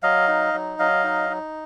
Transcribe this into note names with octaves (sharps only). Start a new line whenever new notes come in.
F#3 D#5 F5
D#4
F#3
F#3 D#5 F5
D#4
D#4